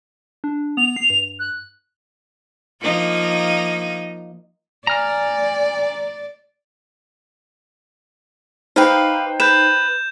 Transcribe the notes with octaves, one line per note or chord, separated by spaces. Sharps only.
D4
B3 F7
C7
G2
F#6
F3 A#3 D#4
D5 G#5 A#5 F6
D#4 G4 B4 C5 F5 G5
B4 G6 E7